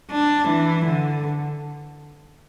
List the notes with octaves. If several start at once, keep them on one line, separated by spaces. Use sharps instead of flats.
D4
E3
D3